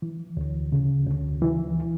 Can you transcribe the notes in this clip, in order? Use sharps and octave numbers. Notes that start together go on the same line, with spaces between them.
E3
D2
C#3
D2
E3